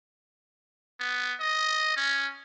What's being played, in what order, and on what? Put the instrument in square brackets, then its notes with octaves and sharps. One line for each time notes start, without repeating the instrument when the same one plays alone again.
[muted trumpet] B3
D#5
C#4